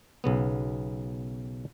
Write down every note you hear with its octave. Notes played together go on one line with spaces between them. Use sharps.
B1 C#3 B3